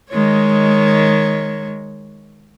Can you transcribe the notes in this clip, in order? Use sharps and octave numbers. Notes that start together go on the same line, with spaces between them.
D#3 G#3 C#5